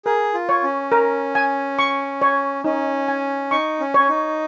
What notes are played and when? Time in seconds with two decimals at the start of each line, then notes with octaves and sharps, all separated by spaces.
0.05 G#4 A#4
0.34 F4
0.49 C#5
0.63 C#4
0.92 A#4
1.35 G#5
1.79 C#6
2.22 C#5
2.64 C#4 D#4
3.08 G#5
3.51 D#4 C#6
3.80 C#4
3.94 C#4 C#5
4.09 D#4